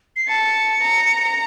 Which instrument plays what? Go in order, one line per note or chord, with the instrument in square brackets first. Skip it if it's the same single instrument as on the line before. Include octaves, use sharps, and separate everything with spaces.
[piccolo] C7
[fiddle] A5 [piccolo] C#7
[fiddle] A#5